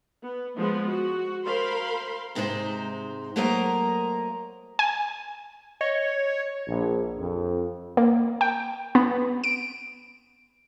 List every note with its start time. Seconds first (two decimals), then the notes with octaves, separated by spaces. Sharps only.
0.23 B3
0.56 F3 G#3 B3
0.87 F#4
1.45 A#4 C5 F5 B5 C6
2.35 G#2 C3 G#3 D#4 C5
3.36 F#3 A3 A#3 A#4 C5 D#5
4.79 G#5
5.81 C#5 D#5
6.66 A#1
7.18 F2
7.97 A#3
8.41 G5
8.95 B3
9.44 D7